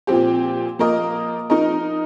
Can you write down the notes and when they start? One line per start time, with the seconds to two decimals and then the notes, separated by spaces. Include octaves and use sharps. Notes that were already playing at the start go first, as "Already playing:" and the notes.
0.07 A#2 F3 C4 G4
0.79 F3 A#3 F4 A#4 D#5
1.50 F3 D#4 A#4 D#5